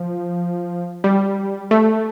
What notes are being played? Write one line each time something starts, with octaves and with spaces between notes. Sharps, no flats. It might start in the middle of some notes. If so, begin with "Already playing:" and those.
Already playing: F3
G3
A3